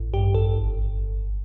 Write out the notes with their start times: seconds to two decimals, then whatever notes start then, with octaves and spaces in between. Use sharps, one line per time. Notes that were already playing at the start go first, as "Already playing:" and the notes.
Already playing: A1
0.14 G2 G4
0.34 A1 A4
0.55 G1